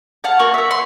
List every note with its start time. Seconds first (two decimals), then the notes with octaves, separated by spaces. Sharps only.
0.24 F5 F#5 A5
0.39 A#3 F#4 C#6
0.54 E5 F#5
0.71 C6